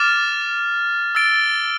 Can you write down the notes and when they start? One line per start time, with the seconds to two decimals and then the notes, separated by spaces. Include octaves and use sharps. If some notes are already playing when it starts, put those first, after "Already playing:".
Already playing: D6 F6 A6 E7
1.15 E6 A6 D7 G7